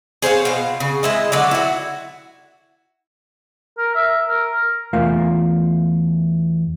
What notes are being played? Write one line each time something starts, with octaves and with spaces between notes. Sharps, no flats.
G#4 C5 C#5 F5
B2 F4
C#3
G#3 E4 D#5
D3 F#3 D5
E4 F#4
A#4
E5
A#4
E2 A3 F4 A#4 F5